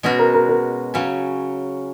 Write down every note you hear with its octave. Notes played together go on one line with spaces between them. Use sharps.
B2 G#3 C#4 F#4
A#4
A#4
A#4
C#3 F#3 C#4